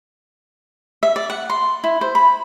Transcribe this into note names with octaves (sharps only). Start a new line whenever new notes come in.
E5
D5
F#5
C6
E4
C5
B5